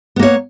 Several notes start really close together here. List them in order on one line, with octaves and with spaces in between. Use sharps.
B3 A#3 C#5